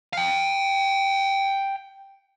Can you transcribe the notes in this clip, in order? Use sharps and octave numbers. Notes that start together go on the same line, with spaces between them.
F5 G5